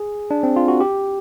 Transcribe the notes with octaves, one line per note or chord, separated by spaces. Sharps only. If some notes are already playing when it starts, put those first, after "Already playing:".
Already playing: G#4
D4
C4
F4
F#4
G4